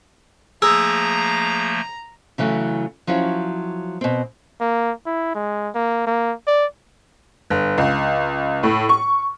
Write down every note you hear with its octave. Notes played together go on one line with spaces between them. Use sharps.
F3 A3 A#3 G#4 A#5 E6
C#3 E3 F#3 A3
F3 F#3 C#4 E4
B2 C4
A#3
E4
G#3
A#3
A#3
D5
G1
C#2
A2
C#6